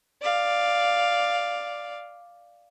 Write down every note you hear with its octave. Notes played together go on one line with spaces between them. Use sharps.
D5 F5